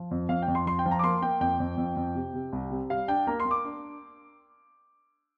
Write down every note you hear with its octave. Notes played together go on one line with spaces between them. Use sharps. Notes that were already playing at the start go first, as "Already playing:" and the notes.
Already playing: F3
F2
F2 F5
G5
F2
C6
F3 C6
G5
F3
A#5
D6
A#3 C6
A#3 G5
F2 G5
F2
F2
F2
C3
C3
C2
C3
G3 F5
D4 G5
A#3 A#5
C6
A#3
D6
D4